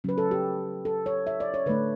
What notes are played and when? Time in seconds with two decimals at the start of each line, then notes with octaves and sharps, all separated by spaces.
0.04 C#3 F#3 C#4 B4
0.18 A4
0.31 G4
0.85 A4
1.06 C#5
1.27 E5
1.40 D5
1.54 C#5
1.66 D3 A3 D4 B4